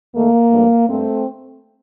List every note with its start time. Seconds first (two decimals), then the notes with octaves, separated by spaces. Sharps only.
0.14 D#2 D#3 A3 A#3
0.51 G2 F3 A3
0.88 G2 A3 C4